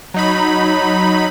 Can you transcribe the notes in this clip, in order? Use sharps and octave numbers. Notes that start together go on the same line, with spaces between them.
F#3 D#4 B5